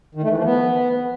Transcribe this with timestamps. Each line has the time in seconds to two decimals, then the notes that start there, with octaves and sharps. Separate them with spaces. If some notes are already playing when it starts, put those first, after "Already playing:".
0.15 D#3
0.22 A3
0.30 E3
0.37 F3
0.45 B3